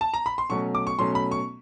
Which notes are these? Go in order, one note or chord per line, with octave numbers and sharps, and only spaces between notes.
A5
A#5
B5
C6
B2 F#3 A3 C#4 C#6
D6
C#6
B2 F#3 A3 C#4 C6
B5
C#6